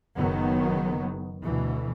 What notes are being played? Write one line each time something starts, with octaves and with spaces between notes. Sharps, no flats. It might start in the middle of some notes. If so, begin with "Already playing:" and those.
F#1 D#3 F#3 B3
D2 B2 E3